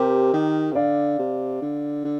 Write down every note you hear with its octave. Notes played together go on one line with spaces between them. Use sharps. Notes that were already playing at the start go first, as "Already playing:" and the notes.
Already playing: C3 G4 A#4
D#3
C3
D3 D5 F5
C3
D3
D3